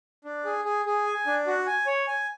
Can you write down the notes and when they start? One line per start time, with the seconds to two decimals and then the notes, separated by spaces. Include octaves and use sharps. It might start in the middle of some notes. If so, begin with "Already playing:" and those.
0.25 D4
0.45 G#4
0.65 G#4
0.86 G#4
1.06 G#5
1.27 D4
1.47 F#4
1.66 G#5
1.86 C#5
2.07 G#5